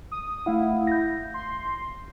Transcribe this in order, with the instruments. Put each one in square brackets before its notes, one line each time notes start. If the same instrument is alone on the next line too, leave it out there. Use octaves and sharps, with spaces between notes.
[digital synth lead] D#6
[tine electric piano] A3 F5 F#5 [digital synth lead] E4
[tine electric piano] G6 A#6
[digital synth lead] C6